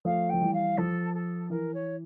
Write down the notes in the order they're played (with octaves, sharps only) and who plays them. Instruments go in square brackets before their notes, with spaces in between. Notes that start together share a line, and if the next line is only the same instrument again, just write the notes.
[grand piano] F3 A3 [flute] F5
[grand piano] F3 [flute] G5
[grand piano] E3 G3
[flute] F5
[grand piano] F3 [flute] A4
[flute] A4
[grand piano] E3 [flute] A#4
[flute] C#5